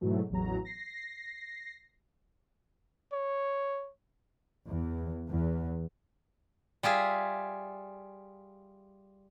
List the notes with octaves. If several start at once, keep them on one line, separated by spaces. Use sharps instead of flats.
G#2 B2 E3 F#3 A3
A1 E2 F#3 A#5
A#6 C7
C#5
E2
E2
G3 F4 G#4 E5